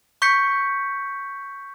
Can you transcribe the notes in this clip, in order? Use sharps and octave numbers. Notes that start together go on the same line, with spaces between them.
C#6 G6 B6 C#7